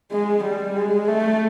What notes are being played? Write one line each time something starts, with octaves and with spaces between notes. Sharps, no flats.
G#3
G3
G#3
A3